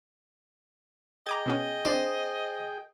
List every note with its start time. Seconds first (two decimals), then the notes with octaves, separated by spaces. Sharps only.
1.26 G#4 D#5 G5 A#5 D6 G#6
1.46 B2 B3 C#4
1.85 C4 D4 C5 D5